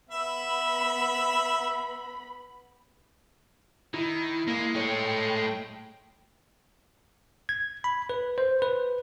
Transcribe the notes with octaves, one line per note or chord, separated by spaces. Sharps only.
B3 E5 B5
D#3 E4
G#3 A#3
A3 C#5 G5
G#6
B5
B4
C5
B4